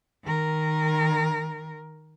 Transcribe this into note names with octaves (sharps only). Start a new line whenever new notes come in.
D#3 A#4